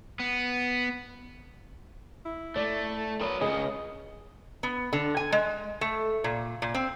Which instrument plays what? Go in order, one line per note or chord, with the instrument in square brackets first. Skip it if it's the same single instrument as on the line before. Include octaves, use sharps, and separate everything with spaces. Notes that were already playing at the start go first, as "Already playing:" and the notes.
[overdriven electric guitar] B3
[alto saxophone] E4
[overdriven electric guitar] A3 [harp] D5
[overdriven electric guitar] F#3 B4 [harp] A#4 D#6
[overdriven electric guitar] C#2 C#3 [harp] G#4 [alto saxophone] D#5
[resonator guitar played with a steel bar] B3
D3
G#5
G#3
A3
A#2
A#2
C4